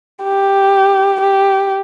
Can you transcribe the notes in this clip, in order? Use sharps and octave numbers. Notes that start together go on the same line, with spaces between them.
G4
G4